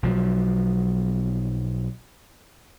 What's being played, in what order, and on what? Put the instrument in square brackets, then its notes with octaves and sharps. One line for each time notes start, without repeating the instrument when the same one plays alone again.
[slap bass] B1 F3 F#3